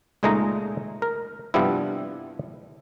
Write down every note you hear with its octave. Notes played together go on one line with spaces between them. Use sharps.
C#2 A#2 G#3 A3 D#4 A#5
A#4
G2 C3 F3 G3 B3 E4